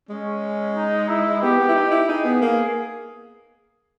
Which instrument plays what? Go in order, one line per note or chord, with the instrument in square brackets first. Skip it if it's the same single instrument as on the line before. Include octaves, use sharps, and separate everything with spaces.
[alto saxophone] G#3 [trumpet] C#4
[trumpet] D#4
E4
[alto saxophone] B3 [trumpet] G4
[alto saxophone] B3
E4
D#4
E4
[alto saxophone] D#4 [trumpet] G#4
[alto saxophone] B3
A#3